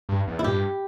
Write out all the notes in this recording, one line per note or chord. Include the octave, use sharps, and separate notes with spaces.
G2
E2
E4
G2 G4